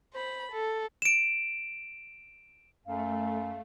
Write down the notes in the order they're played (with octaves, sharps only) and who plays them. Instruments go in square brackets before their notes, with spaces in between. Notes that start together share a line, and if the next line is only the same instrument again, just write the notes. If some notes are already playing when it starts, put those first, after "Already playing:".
[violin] C5 B5
A4
[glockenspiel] D7 E7
[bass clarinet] F#2 [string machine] A3 [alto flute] F5